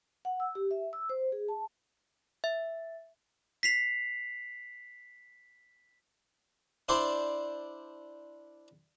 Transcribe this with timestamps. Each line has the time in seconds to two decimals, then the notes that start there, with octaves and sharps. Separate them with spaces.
0.25 F#5
0.40 E6
0.55 G4
0.71 E5
0.93 E6
1.10 C5
1.32 G#4
1.49 A5
2.44 E5
3.63 B6 C7 F7
6.89 D4 E4 C5 D5 A5 C6